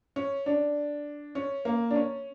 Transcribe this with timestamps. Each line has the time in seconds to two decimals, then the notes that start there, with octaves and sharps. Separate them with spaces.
0.16 C#4
0.46 D4
1.35 C#4
1.65 A#3
1.91 D4
1.96 C#4